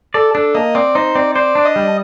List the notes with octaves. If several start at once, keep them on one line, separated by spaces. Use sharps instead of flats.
A4 D5
D4 A4
A#3 D#5
C4 D5
D#4 C5
C4 D5
C5 D5
D4
D#5
G3